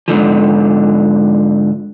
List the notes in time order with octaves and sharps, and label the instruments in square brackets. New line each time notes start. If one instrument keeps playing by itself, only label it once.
[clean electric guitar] G#2 D3 D#3 F3